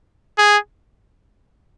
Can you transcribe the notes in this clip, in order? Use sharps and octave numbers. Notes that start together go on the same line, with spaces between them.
G#4